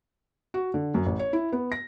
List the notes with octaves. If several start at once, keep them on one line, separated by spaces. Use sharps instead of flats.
F#4
D3
F#2
A1
C#5
E4
B3
A#6